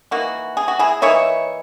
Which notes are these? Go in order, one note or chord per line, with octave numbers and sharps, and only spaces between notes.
E3 A#3 D#4 F#4
G#4
F#4
E4 G#4
E3 A#3 D#4 C#5 E5